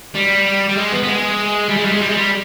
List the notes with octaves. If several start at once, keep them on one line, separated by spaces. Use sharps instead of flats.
G3
G3
G#3
B3
B3
G#3
G3
G#3
G3
G#3
G3
G#3
G3